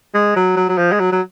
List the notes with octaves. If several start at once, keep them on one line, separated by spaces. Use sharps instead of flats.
G#3
F#3
F#3
F#3
F3
G#3
F#3
F#3